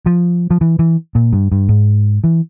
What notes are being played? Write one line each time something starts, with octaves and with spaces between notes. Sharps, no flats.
F3
F3
E3
E3
A#2
G2
G2
G#2
E3